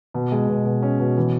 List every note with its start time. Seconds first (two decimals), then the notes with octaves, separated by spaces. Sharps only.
0.14 B2
0.32 G#3
0.48 B2
0.65 B2
0.82 C#4
0.99 B2
1.17 E3